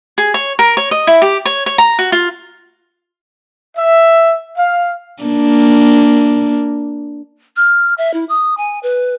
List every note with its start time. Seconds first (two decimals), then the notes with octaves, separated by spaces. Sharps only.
0.18 G#4
0.34 C#5
0.59 A#4
0.77 C#5
0.91 D#5
1.07 E4
1.22 G4
1.45 C#5
1.66 C#5
1.78 A#5
1.99 F#4
2.12 F4
3.76 E5
4.58 F5
5.23 A#3 D4
7.56 F6
7.98 E5
8.14 E4
8.29 D#6
8.58 G#5
8.83 B4